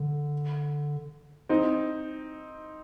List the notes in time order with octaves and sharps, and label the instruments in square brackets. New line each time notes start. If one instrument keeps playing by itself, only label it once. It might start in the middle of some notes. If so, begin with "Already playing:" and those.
Already playing: [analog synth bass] D3
[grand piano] C4 D#4